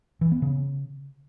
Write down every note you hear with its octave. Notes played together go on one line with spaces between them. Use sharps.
E3
B3
C#3